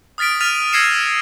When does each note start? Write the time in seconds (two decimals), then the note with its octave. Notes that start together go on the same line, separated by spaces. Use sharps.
0.18 D#6 F6 A6 B6 D7
0.41 F6 A6 B6 D#7 F7
0.73 E6 G#6 A#6 C7 C#7 E7